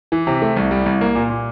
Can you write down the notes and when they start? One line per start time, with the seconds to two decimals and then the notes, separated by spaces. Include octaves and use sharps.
0.12 E3
0.27 C3
0.42 A3
0.57 C2
0.71 G3
0.86 C2
1.01 A#3
1.15 A#2
1.30 A#2